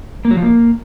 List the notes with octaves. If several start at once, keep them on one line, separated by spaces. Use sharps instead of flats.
A#3
F#3
F3
A#3